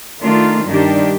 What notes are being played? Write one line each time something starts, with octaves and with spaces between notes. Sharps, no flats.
D#3 A3 D4 F4
G2 D#3 G3 D4 G4